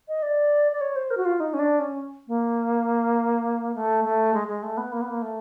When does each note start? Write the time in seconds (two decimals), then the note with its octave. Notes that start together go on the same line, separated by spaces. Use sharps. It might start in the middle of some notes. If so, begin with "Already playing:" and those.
0.08 D#5
0.22 D5
0.72 D5
0.81 C#5
0.96 C5
1.10 A#4
1.17 F#4
1.25 F4
1.40 D#4
1.54 C#4
1.59 D4
1.79 C#4
2.28 A#3
3.75 A3
4.04 A3
4.34 G#3
4.48 G#3
4.63 A3
4.77 B3
4.92 A#3
5.01 B3
5.10 A#3
5.22 A3